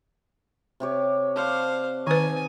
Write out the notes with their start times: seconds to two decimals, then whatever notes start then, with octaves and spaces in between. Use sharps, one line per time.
0.80 C3 G4 C#5
1.36 C5 D5 F5 F#5 A5
2.07 D#3 D#4 B4 G#5